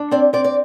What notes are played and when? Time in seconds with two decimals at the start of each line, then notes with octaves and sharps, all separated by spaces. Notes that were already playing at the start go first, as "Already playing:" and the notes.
Already playing: D4
0.11 C4 D5
0.33 C4 D5
0.44 D5